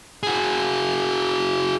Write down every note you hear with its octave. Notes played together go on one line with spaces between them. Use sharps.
F#4 G#4